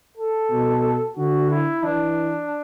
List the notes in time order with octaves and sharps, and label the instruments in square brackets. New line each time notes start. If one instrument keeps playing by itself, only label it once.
[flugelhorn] A4
[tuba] B2
[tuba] D3 [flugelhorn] F#4
[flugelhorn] E4
[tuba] E3 [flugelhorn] D4